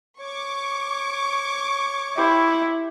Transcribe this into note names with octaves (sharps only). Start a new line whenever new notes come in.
C#5 C#6 D6
E4 G4 C5 B5